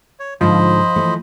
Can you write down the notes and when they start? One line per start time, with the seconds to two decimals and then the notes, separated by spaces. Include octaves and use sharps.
0.20 C#5
0.41 G#2 D3 F3 C5 D#5 B5
0.96 E3 A3